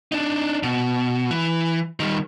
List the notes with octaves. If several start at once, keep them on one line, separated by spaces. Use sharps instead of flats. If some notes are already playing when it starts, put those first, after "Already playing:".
D4 D#4
B2
E3
D#3 G3